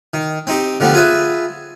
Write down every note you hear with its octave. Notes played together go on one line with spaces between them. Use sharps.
D#3
C4 D#4 G4
D3 F3 G3 A3 B3
F4 G#4 B4 E5